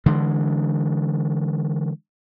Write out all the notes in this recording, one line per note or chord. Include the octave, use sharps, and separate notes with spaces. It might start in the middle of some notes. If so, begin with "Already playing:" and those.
D3 E3 G#3